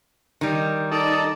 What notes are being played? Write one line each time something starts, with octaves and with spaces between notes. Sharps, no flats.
D#3 G3
D#4 A4 D5